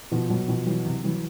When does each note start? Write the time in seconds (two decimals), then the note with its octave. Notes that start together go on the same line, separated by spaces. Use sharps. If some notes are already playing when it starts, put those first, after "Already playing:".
0.12 B2 F3
0.30 B2 F#3
0.48 B2 F3
0.66 E3 F#3
0.85 C3
1.04 E3 F#3